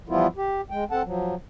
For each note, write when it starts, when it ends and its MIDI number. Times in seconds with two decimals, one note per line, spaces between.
0.09 0.27 52
0.09 0.27 53
0.09 0.27 55
0.09 0.27 59
0.09 0.27 64
0.09 0.27 65
0.37 0.61 67
0.71 0.84 56
0.71 0.84 79
0.91 1.02 60
0.91 1.02 69
0.91 1.02 78
0.91 1.02 81
1.05 1.35 53
1.05 1.35 54